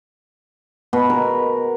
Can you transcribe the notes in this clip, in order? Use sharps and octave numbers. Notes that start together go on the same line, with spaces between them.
B2
A#4